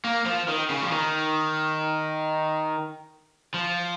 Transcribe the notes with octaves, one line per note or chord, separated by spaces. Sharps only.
A#3
F3
D#3
C#3
F3
D#3
F3